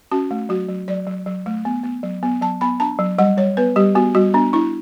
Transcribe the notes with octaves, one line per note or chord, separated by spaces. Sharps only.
C#4 F#4
A3
F#3 F#4
F#3
F#3 D5
F#3
F#3
A3
B3
B3
F#3
B3
F#3 A5
B3 B5
D4 A5
F#3
G3 F#5
G3 C#5
B3 B4
G3 G4
B3 F#4
G3 F#4
B3 D4
D4 E4